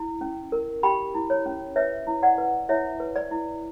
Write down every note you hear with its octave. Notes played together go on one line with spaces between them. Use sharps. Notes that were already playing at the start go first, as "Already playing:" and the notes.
Already playing: E4
C#4
A#4
G4 G5 B5
E4
C#5
C#4
B4 C#5 E5
E4
D5 F#5
B4
E4 C#5 E5
B4
D5
E4